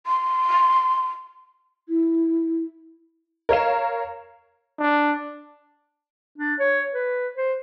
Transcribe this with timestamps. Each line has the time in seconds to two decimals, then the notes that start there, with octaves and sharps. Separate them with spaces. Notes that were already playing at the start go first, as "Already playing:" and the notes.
0.06 C6
1.89 E4
3.49 A#4 C#5 F5 E7
4.79 D4
6.38 D4
6.59 C#5
6.94 B4
7.36 C5